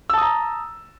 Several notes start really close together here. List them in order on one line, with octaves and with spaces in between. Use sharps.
E6 A5 D#6 A#5